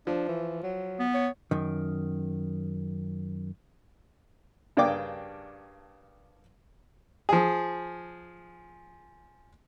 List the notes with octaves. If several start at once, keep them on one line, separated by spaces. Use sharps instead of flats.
F3 D4
E3
F#3
B3
C#5
F#2 D#3
G2 C#3 A#3 D4 G5 D6
F3 G#4